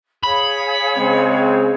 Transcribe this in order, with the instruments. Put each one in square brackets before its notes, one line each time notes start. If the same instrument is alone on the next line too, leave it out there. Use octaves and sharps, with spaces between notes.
[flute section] G#4 C#5 F5 [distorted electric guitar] B5
[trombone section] C#3 G#3 C4